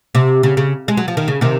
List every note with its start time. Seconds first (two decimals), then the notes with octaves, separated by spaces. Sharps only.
0.15 C3
0.43 C#3
0.57 C#3
0.88 G#3
0.97 F#3
1.08 F3
1.17 D#3
1.28 C#3
1.41 C3 D#3